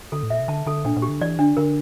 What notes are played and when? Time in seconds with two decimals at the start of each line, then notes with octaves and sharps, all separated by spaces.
0.12 D3 A4
0.23 A2
0.30 A#2 E5
0.40 C3
0.48 D3 A5
0.66 D3 A4
0.85 A#2 D4
0.97 A#2
1.02 G4
1.09 D3
1.21 E3 D5
1.39 D3 D4
1.57 D3 A#4